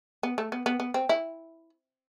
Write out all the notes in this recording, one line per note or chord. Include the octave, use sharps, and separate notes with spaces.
B3
A3
B3
B3
B3
C4
E4